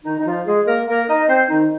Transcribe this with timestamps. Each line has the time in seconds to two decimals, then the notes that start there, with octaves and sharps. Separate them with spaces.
0.04 D#3 D#4
0.19 D#4
0.26 F3 F4
0.46 G#3 G#4
0.67 A#3 A#4
0.87 A#3 A#4
1.09 D#4 D#5
1.28 C4 C5
1.49 D#3 D#4